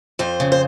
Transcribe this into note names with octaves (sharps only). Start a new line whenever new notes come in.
F2 C5
C#3
C5